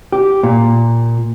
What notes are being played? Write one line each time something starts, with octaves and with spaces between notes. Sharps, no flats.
G4
A#2